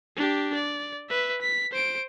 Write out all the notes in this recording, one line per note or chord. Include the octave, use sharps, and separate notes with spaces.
D4 G4
D5
B4 E5
B6
C5 D7